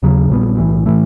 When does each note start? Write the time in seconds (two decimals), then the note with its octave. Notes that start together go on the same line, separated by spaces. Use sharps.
0.03 D#2 C#3 F#3
0.30 A#1 A#2 G3 B3
0.58 B1 A2 E3
0.86 A2 E3 A3